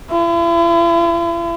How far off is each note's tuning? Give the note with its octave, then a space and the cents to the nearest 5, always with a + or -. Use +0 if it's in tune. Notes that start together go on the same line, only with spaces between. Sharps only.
E4 +45